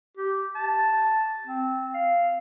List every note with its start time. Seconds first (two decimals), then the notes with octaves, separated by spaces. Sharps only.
0.17 G4
0.55 A5
1.47 C4
1.94 F5